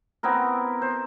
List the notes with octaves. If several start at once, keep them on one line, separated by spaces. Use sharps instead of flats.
B3 C4 E4 A#4
C5